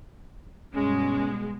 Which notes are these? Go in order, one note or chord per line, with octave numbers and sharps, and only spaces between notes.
G2 B2 G#3 C#4